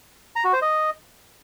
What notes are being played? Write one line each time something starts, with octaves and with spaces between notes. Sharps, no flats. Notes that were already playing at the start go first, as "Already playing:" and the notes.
A#5
F#4
C5
D#5